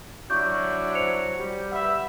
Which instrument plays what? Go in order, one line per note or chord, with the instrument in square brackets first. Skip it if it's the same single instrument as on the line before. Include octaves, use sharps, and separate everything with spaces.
[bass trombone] F#3 [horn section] D4 E4 F#4 [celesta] C#6 G6
[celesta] C5 C#7 F7
[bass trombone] G3
[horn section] B4 E5 [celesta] F#5